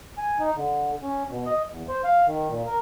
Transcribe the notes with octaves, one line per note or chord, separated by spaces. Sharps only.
G#5
D#4
D3
C#4
B2
D#5
E2
C5
F5
D#3
A#2
A#4